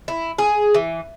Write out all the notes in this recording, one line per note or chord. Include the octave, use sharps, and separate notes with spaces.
E4
G#4
E3